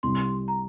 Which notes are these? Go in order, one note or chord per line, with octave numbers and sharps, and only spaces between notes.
C2 C3 G3 C6
A#5